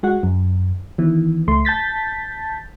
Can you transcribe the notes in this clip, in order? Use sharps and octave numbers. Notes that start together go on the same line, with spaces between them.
G#3 F#4 F#5
F#2
D#3 E3 B3
C#2 A3 C6
A5 G6 A6 B6